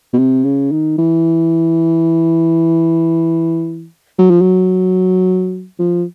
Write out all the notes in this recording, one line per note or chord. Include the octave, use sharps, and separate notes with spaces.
B2
C3
C#3
D#3
E3
F#3
F3
F#3
F3